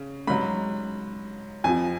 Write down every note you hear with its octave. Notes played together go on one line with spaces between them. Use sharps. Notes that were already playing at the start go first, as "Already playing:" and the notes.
Already playing: C#3
G#2 F#3 B5
F2 F3 G#5